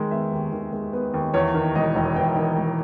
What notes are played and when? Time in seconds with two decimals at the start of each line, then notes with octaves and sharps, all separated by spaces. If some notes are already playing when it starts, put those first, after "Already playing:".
Already playing: D#3 G#3
0.11 B3 E5
0.32 D#2
0.52 D#3
0.73 G#3
0.93 B3 B4
1.14 D#2
1.34 E2 C#5
1.54 D#3
1.75 E1 D#5
1.96 E1
2.16 E2 G5
2.36 D#3
2.57 E1